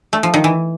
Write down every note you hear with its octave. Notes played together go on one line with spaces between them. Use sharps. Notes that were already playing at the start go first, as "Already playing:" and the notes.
A3
F3
D#3
E3